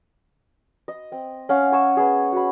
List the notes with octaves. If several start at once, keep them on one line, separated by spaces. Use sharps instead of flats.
D#5
C4
C#4 F5 F#5
G#5 C#6 E6
B3 G#4
F#4 B5